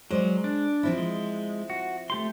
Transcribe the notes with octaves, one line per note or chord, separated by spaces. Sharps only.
F#3 G#3 C5 D5
D4
F3 C4 E4
G#3
F#4
A3 G4 C6